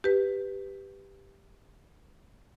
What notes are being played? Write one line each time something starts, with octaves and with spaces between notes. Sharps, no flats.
G4 B4